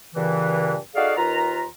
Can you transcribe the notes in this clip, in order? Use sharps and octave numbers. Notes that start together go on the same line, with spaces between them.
G2 A#2 C#3 E3
D#4 F#4 G#4 A4 D5 F5
D#2 D#3 F4 B4 A#5